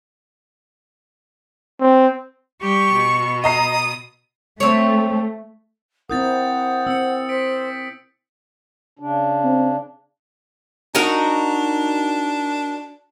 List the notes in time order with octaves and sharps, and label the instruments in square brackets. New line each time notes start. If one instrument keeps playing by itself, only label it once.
[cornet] C4
[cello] G3 G4 [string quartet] C#6
[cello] B2
[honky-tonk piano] D#5 A#5 C7 [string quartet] D#6
[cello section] A3 [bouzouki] C4 C#5
[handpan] C4 E4 A#4 [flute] F#5 [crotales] D#6 G6 A6
[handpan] C4 [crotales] E6 C#7
[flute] C5 [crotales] B6 D7
[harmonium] C#3 D4
[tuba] C4
[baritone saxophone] D4 [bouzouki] D#4 F#4 A#4